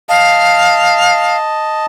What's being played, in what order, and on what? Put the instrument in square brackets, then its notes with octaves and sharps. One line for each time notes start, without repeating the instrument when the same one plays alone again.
[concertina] D#5 A5 [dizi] F5